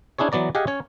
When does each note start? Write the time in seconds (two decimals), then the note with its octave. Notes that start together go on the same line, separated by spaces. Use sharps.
0.18 C#4 D4 E4 G#4 C#5
0.32 E3 F#3 B3 D5 A#5
0.55 G4 G#4 D#5 F5 F#5 G#5
0.67 C#4 C#5